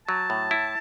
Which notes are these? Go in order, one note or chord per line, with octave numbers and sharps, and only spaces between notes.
F#3 A5
A2
E4